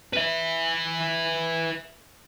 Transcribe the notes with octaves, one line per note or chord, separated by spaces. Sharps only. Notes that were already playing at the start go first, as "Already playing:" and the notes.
B4 E5